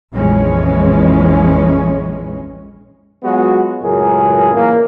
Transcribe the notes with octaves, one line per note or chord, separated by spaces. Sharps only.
A#1 F2 E3 G#3 C#4
F#3 G#3 B3 F4 F#4
C#2 F#2 A2 G#4 A#4
A#2 E3 A#3